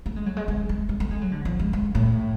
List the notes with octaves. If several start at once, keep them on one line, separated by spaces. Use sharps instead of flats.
A3
G#3
F#3
G#3
G#3
G#3
G#3
A3
G#3
F#3
D3
F3
G#3
G#3
A2